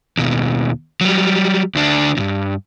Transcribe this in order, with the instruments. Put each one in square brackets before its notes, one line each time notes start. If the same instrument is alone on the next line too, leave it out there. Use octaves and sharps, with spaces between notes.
[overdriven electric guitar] D#2 B2
F#3 G3
D2 D4
D2 G2